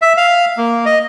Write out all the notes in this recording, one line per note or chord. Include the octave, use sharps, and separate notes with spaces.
E5
F5
A#3
D#5